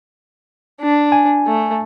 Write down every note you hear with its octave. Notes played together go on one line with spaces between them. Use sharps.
D4
G#5
A3